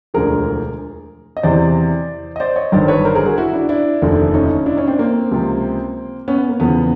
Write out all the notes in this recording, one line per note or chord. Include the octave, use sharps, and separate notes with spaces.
E1 D2 D3 F3 G#4 A#4
D#5
E2 C3 E3 C5 D5
D#5
C5 D5
C#5 D#5
G1 G2 D#3 C5 D5
B4 C#5
A#4 C5
G#4 A#4
F#4 G#4
E4 F#4
D4 E4
D4 E4
F1 D#2 D3 F3
C#4 D#4
D4 E4
C#4 D#4
C4 D4
A#3 C4
C#2 C3 F3
B3 C#4
B3
A#3
E2 C#3 F3 B3